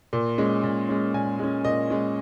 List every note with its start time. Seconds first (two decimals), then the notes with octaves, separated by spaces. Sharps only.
0.13 A#2
0.38 G#3 C#4
0.63 A#2
0.89 G#3 C#4
1.14 A#2 G#5
1.39 G#3 C#4
1.65 A#2 D#5
1.90 G#3 C#4